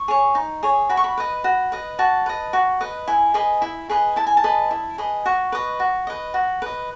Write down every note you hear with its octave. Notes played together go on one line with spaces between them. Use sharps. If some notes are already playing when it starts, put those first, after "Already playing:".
Already playing: C#6
G#4 C#5
D#4
G#4 C#5
F#4 B5
C#6
B5
B4 D#5
F#4
B4 D#5
F#4 A5
B4 D#5
F#4
B4 D#5
E4 G#5
G#4 B4 D#5
E4
G#4 B4 D#5
E4 A5
G#5
A5
G#4 B4 D#5
E4
G#4 B4 D#5
F#4 C#6
B4 D#5
F#4
B4 D#5
F#4
B4 D#5